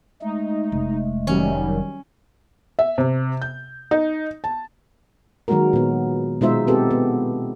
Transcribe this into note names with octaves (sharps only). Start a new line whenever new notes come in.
G#3 A3 D#4
F1
D#3 F#3 G3 C#4
E5
C3
G6
D#4
A5
D#3 F#3 G#3 A#3 F#4 A#4
A#2 B3
B2 G#3 D#4 F4 C5 E5
B3 C4 G4 A4
B3